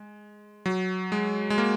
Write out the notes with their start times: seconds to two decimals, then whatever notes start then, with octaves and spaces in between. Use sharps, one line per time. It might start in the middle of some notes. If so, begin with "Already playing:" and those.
Already playing: G#3
0.66 F#3
1.12 G#3
1.50 G#3
1.58 A#3